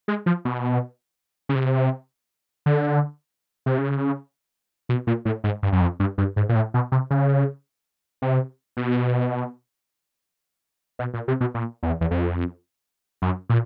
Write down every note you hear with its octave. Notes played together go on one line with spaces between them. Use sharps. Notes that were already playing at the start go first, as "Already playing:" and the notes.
G#3
F3
B2
C#3
C3
D3
C3
C#3
B2
A#2
A2
G#2
G2
F#2
F2
G2
G2
G#2
A#2
A2
B2
C3
C#3
C3
B2
B2
A#2
C3
B2
A#2
E2
E2
F2
F#2
A#2